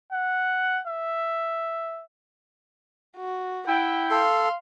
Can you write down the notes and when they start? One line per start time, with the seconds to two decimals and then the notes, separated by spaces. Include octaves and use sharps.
0.12 F#5
0.87 E5
3.17 F#4
3.67 E4 F#5 G5
4.11 A4 F5 C6